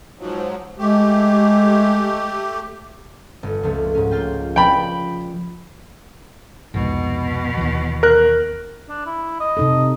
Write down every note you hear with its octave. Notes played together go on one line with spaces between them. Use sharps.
G#2 F3 F#3
G#3 A3 G4
G1
C#2 F3 A3
G#2 C#4
A#3 F4 G5
F3 B4 D5 G5 B5
C2 F2 G#2 B2
D#2 E3
A#4 F#6
D4
E4
D#5
C3 D#4 A4